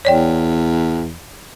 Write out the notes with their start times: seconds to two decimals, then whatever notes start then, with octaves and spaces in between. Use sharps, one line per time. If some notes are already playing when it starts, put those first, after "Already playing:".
0.05 E2 C#5 D5 G5